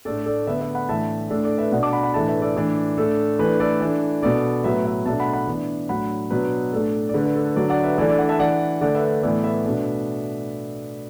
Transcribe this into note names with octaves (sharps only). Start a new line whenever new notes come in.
A2 A3 D4 A4 D5
A4 D5
D3 B3 D4 B4 E5
B4 E5
F#5 B5
A2 E3 D4 E5 A5
A2 A3 D4 A4
A4 D5
B4 E5
B2 B3 D4 D5 F#5
A5 D6
F#5 B5
F#5 B5
A2 E3 A3 D4 E5 A5
B4 E5
A4 D5
A2 E3 D4
A2 A3 D4 A4
E3 A3 D4 B4
A4 D5
E3 D4
B2 B3 D4 A4 D5
A2 F#3 B3 B4 E5
B4 E5
B2 A3 D4 E5 A5
F#5 B5
F#5 B5
E3 B3 D4
A2 F#3 D4 F#5 B5
B2 F#3 B3 D4 B4
A2 A3 D4 A4
D5
D3 A3 D4 B4
B4
A4
B4
D3 F#3 D4 A4 D5
D5 F#5
B4 E5
E3 A3 D4 A4 D5
A4 D5
D5 F#5
E5 A5
E3 D4 D5 F#5
D3 A3 D4 D5 F#5
B4 E5
A2 E3 B3 A4 D5
B4 E5
B2 A3 D4